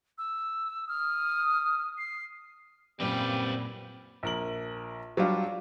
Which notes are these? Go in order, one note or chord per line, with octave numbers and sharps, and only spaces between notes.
E6
D#6 F6
C7
F#2 A#2 G3 C4 B4
A#1 A#4 F#7
F#3 G3 D4 F4